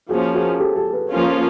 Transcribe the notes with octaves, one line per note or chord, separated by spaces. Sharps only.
F3 A#3 C#4 F#4 G#4
F#4 G#4
G4 A4
G4 A4
A4 B4
F3 A#3 C#4 F4